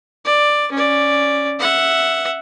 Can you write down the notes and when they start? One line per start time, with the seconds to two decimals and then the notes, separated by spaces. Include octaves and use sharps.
0.25 D5
0.72 C#4 D5
1.59 E5 F#5